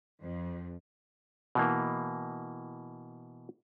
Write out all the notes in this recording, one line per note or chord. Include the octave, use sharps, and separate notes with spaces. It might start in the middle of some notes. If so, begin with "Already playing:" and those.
F2
B2 E3 A#3